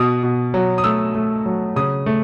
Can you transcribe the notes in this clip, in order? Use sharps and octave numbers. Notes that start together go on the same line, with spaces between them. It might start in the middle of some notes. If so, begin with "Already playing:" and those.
Already playing: B2 D#6
B2
F#3
D#6
A3 E6
A3
F#3
C#3 D#6
A3